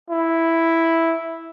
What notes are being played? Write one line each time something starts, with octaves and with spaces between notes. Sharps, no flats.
E4